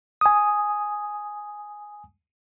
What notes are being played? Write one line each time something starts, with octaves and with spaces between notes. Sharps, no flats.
G#5 D#6